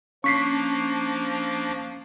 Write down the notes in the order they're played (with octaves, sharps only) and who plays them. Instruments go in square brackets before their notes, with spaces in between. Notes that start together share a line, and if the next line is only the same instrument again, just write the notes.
[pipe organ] F3 A#3 D4 [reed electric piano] C#4 [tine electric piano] C#6 B6 C7